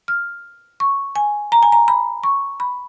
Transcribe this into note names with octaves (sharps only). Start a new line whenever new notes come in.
F6
C#6
G#5
A#5
G#5
A#5
B5
C#6
B5